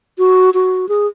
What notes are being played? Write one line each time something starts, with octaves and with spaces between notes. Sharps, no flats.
F#4
F#4
G#4